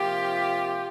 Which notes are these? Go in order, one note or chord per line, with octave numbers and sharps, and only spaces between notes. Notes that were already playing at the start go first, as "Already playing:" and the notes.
Already playing: C3 F3 A#3 F4 G4